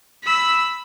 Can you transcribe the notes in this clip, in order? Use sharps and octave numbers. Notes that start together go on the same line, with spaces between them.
B5 E6